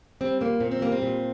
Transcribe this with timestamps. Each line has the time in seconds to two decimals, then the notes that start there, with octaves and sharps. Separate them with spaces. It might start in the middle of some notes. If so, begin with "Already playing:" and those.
0.21 G3 C4
0.41 A#2 A#3
0.60 A#2 C4
0.71 C4
0.82 G3 A#3
0.92 C4
1.02 A#2